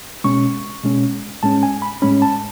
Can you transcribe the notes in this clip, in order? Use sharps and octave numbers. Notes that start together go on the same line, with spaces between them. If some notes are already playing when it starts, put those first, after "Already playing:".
B2 G#3 C#4 C#6
B2 G#3 C#4
A2 G#3 C#4 A5
G#5
B5
A2 G#3 C#4 B5
A5